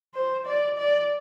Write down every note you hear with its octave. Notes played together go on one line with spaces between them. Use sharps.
C5
D5
D5